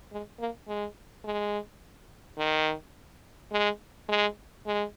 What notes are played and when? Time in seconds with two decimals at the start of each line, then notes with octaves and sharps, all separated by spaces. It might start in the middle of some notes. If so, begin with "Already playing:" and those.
0.12 G#3
0.39 A#3
0.68 G#3
1.25 G#3
2.38 D#3
3.52 G#3
4.09 G#3
4.66 G#3